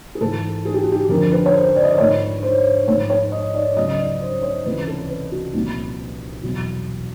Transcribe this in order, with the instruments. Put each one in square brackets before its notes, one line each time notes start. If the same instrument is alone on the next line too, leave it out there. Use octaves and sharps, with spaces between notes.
[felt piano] G#4
G#2 E3 A4
G#4
G4
F#4
G4
F2 D3 F3 A#4
B4
C#5
C5
D5
D#5
D5
G#2 F3 C#5
C5
G#2 F3 C#5
C#5
D#5
D5
C#2 C#3 F#3 D#5
D5
C5
C#5
C#2 C3 E3 B4
A4
B4
F#4
C2 A#2 F3
E2 B2 F#3